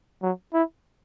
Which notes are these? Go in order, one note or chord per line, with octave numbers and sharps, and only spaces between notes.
F#3
E4